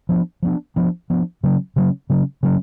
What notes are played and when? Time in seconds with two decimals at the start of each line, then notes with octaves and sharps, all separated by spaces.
0.09 F3 B3 D4
0.42 F3 B3 D4
0.76 F3 B3 D4
1.10 F3 B3 D4
1.43 C#3 F#3 C#4
1.76 C#3 F#3 C#4
2.10 C#3 F#3 C#4
2.43 C#3 F#3 C#4